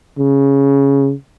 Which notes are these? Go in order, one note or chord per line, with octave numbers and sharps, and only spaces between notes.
C#3